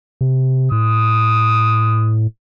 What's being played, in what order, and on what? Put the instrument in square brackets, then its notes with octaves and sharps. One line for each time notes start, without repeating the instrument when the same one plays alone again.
[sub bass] C3
[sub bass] A2 [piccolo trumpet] D#6